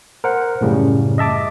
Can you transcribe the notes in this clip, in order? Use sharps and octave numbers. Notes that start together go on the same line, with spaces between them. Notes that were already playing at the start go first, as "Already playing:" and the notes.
A#4 C5 F#5
F#2 A2 C#3 G3
D#5 E5 A5 D6